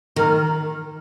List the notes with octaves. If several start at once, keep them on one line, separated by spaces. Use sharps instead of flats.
D#3 A#4